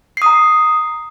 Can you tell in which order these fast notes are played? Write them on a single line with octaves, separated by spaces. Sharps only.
C7 D#6 A#5